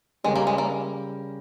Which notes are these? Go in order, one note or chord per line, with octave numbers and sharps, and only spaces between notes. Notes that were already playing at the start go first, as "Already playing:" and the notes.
C#3 G3 G#3 C#4 G4 A#4
A#3
G#3
A#3